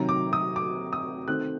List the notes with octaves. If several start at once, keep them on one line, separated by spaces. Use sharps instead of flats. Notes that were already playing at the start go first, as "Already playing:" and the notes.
Already playing: C3 D#3 F#3 A#5
D6
D#6
D6
D#6
D#3 A3 C4 F#6